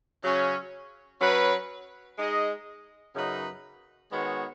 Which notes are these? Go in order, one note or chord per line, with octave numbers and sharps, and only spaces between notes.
C#3 F#3 C#4
F#3 C#4 B4
G#3 D#4 G#4 D#5
F#2 C#3 F#3 D#4 B4
D#3 G#3 B3 F#4 C#5